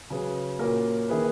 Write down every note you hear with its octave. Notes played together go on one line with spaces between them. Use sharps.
C#3 F#3 C#4 G#4 B4
A#2 A#3 C#4 F#4 A#4
D#3 A#3 E4 G#4 B4